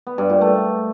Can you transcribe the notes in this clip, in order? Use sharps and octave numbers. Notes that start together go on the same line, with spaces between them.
B3
G2
A#2
A3